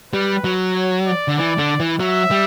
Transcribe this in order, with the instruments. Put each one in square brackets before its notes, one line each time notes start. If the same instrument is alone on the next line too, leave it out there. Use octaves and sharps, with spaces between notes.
[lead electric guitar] G3 [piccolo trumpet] B4
[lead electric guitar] F#3
[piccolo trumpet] C#5
D5
[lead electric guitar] D3
[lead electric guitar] E3 [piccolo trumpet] D5
[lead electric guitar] D3
E3
[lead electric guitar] F#3 [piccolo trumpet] E5
[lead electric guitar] G3